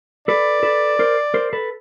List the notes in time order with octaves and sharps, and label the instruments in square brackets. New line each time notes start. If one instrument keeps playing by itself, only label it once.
[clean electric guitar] A4 B4 [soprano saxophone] D5
[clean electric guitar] A4 B4
A#4 C5
A#4 C5
A4 B4